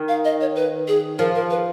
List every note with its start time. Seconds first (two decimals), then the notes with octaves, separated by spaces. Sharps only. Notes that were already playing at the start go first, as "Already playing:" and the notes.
Already playing: D#3
0.08 F5
0.25 D#5
0.41 C#5
0.55 B4
0.88 G#4
1.19 F3 A#4
1.35 A#4
1.50 B4